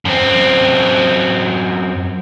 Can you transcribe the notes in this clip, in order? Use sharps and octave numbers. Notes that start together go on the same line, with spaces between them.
F#2 C4